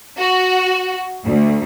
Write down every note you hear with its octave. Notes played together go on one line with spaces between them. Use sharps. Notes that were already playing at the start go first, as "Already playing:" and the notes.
F#4
D2